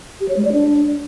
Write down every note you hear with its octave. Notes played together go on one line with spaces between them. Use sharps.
G4
C#5
G#3
D5
D4